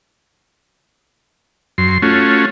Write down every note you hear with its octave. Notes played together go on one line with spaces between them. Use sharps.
F#2 C6
A3 C#4 F4 F#4